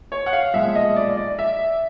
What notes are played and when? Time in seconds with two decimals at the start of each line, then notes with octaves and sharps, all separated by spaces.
0.12 C#5
0.26 F#5
0.33 F5
0.54 B1 A#2 F3 G#3 E5
0.75 D#5
0.96 D5
1.17 D5
1.39 E5